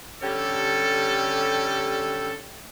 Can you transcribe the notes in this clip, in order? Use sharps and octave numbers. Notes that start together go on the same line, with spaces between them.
D3 G3 C#4 G4 A4